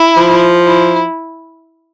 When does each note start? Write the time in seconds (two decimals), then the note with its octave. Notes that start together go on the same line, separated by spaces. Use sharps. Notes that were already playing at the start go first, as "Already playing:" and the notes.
Already playing: E4
0.17 F3
0.64 E4